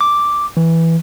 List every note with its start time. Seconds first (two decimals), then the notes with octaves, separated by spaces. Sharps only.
0.01 D6
0.57 E3